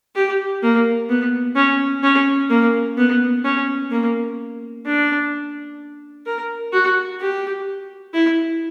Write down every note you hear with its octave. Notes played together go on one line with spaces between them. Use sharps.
G4
A#3
B3
C#4
C#4
A#3
B3
C#4
A#3
D4
A#4
F#4
G4
E4